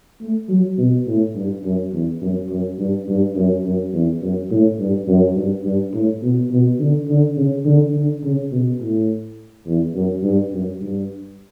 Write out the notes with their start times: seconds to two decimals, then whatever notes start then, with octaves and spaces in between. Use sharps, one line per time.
0.21 A3
0.49 F#3
0.78 B2
1.07 A2
1.35 G2
1.64 F#2
1.92 E2
2.21 F#2
2.49 F#2
2.78 G2
3.08 G2
3.36 F#2
3.64 F#2
3.93 E2
4.22 F#2
4.51 A2
4.79 G2
5.08 F#2
5.36 G2
5.65 G2
5.93 A2
6.22 B2
6.51 B2
6.80 D3
7.08 D3
7.37 C#3
7.65 D3
7.94 D3
8.23 C#3
8.52 B2
8.80 A2
9.66 E2
9.94 F#2
10.23 G2
10.52 F#2
10.81 G2